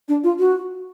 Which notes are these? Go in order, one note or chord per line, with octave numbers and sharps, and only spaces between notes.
D4
F4
F#4